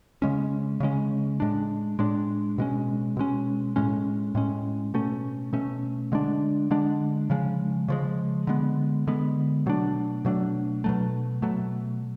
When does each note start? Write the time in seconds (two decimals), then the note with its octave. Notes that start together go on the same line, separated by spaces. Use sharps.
0.22 C#3 G#3 C#4
0.80 C#3 G#3 C#4
1.40 A2 G#3 D4
1.99 A2 G#3 D4
2.58 B2 G#3 C#4
3.17 B2 G#3 C#4
3.76 A2 G#3 C#4
4.35 A2 G#3 C#4
4.94 B2 A3 C#4
5.53 B2 A3 C#4
6.12 D3 G#3 D4
6.71 D3 G#3 D4
7.30 C#3 F3 G#3
7.88 C#3 F3 G#3
8.47 D3 G#3 B3
9.07 D3 G#3 B3
9.66 B2 F#3 A3 D4
10.25 B2 F#3 A3 D4
10.84 B2 F#3 A3
11.42 B2 F#3 A3